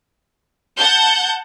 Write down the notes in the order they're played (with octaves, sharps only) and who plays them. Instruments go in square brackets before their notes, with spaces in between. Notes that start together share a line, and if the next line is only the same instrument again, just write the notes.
[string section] F#5 A5 G6